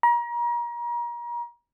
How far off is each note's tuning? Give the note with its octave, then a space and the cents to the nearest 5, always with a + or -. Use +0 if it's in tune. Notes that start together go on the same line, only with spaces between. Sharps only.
A#5 +35